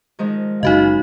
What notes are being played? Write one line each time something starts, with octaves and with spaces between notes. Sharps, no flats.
D#3 F3 G#3
F#1 F#2 C#3 D#4 F#4 D#5 F5